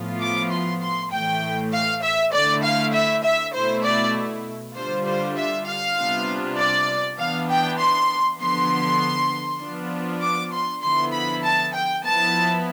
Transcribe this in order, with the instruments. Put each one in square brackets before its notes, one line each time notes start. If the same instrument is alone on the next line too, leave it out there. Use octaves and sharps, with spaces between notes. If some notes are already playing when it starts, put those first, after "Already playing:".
Already playing: [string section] A2 F3 B3 F4
D6
C6
C6
A2 E3 A3 G5
F5
E5
D3 A3 E4 D5
F5
E5
E5
B2 A3 E4 C5
D5
D3 G3 D4 F4 C5
C5
E5
F5
C3 G3 B3 D4 F4
D5
E3 B3 D4 F5
G5
C6
D3 F3 B3 C6
F3 B3 D4 F4
D6
C6
D3 F3 B3 E4 C6
B5
A5
G5
F3 B3 E4 A5